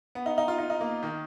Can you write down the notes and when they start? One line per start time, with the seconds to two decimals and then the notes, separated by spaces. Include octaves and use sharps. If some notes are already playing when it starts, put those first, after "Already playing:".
0.15 B3
0.26 D#4
0.38 D#4
0.48 F4
0.58 D#4
0.70 D#4
0.81 A#3
1.03 D#3